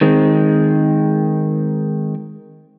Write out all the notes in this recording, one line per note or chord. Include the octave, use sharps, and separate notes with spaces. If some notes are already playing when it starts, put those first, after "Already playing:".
D#3 G#3 C4